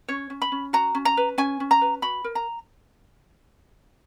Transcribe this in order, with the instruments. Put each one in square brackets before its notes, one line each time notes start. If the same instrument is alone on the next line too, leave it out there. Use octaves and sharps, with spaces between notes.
[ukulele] C#4 C#5
C#4
B5
C#4
F#4 A#5
C#4
A#5
B4
C#4 G#5
C#4
A#5
B4
F#4 B5
A#4
A#5